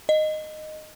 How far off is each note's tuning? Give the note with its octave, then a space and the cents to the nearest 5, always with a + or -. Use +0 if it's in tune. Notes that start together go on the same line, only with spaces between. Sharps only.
D#5 -10